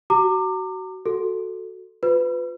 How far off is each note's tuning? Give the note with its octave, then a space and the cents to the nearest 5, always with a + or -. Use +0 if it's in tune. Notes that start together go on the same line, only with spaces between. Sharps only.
F#4 +25 A#5 -30 D6 +15
F#4 +0 A4 +0
F4 +20 B4 +20